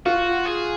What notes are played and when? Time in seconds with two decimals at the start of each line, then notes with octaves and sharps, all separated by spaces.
0.06 F4 F#4
0.46 G#4